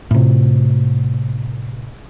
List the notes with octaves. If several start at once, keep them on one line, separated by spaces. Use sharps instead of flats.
A2 C3